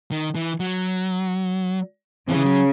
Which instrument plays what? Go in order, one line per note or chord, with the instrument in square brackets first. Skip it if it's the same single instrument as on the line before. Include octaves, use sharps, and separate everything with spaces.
[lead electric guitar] D#3
E3
F#3
[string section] C#3 [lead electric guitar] E3
[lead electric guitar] F#3